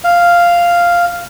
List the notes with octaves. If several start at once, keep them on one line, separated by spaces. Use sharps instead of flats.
F5